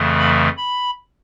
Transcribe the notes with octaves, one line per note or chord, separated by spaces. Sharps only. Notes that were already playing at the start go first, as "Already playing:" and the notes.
Already playing: F2 C#3 E3 A3
B5
B5